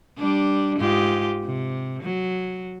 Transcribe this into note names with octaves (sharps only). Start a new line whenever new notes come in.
G3 D4
G#2 F4 G4
C3
F#3